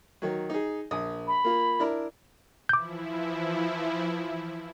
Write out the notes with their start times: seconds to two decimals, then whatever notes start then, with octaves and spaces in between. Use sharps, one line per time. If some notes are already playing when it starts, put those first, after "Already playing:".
0.22 D#3 F#3
0.50 D#4 G#4
0.91 A#1 D#6
1.27 B5
1.44 A#3 F4
1.79 D4 E4 A#4
2.69 E3 F3 E4 D6 G6